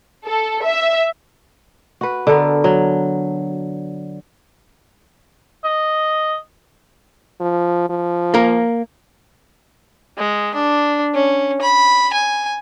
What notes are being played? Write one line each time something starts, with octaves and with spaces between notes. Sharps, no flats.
A4
E5
F#4 B4
D3 B3 A4 A#4
F#3
D#5
F3
F3
A#3 A#4
G#3
D4
C#4
B5
G#5